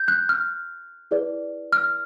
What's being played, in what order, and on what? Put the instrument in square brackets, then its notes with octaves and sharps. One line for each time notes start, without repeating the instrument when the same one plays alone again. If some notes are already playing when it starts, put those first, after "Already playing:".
Already playing: [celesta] G6
F#6
F6
E4 G#4 B4 D5
F6